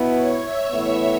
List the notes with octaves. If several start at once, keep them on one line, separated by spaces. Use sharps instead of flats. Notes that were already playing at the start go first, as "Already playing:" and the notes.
Already playing: B2 B3 E4
C#5
E5
A2 E3 B3 E4